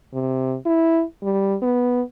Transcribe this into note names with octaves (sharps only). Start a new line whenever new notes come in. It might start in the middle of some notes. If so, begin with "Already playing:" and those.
C3
E4
G3
B3